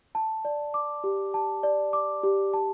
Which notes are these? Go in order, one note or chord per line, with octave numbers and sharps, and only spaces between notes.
A5
D5
D6
G4
A5
D5
D6
G4
A5